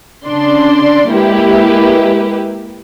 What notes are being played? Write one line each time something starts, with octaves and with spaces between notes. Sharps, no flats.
C#3 D4 D5 C6
G#3 A#3 E4 G4 B4